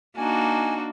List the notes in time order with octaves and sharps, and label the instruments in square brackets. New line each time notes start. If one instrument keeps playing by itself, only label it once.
[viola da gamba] A#3 F#4 [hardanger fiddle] D4 D#4 [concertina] G#5